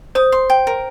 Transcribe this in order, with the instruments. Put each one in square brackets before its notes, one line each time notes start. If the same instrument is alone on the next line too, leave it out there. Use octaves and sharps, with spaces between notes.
[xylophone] C5 [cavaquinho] D#6
[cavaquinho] C6
G5
A#4